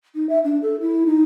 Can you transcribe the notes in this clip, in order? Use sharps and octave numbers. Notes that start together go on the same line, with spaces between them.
D#4
E5
D4
A4
E4
D#4